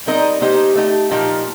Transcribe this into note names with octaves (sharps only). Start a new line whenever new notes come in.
G3 C4 D#4 A#4 D#5
A#3 D#4 G4 C5 D#5
A3 D#4 G4
A#2 F3 A#3 D#4 G4